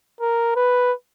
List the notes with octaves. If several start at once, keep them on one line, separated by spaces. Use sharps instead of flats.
A#4
B4